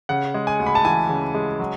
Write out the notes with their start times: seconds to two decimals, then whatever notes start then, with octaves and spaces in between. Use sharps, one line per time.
0.09 C#3 F#5
0.34 G#3
0.47 G#5
0.60 D2
0.66 B5
0.75 A5
0.85 E3 G#5
1.09 C#3
1.35 G#3
1.60 F#3